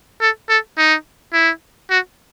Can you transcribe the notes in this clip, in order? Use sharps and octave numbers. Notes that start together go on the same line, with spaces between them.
A4
A4
D#4
E4
F#4